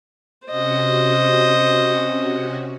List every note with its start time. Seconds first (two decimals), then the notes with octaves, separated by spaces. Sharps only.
0.48 C3 C#4 F#4 C5 D#5